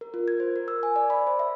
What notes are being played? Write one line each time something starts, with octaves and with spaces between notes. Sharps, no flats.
A#4
F4
G#6
C5
A#4
E6
G#5
D5
B5
C5
E5